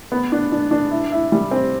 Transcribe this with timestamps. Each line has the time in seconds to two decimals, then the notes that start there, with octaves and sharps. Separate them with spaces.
0.12 B3
0.32 D4
0.52 D4
0.71 D4
0.91 E4
1.12 E4
1.32 G3
1.51 C4